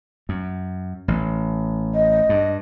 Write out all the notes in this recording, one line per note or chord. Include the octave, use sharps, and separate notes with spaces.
F#2
A1
D#5
G2